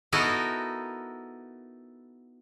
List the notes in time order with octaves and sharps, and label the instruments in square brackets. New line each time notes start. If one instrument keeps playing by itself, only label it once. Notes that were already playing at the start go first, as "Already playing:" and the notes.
[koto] B3 D#4 E4 F#4 A4 A#4